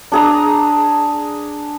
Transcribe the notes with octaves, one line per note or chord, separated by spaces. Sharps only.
D4 G#4 A#5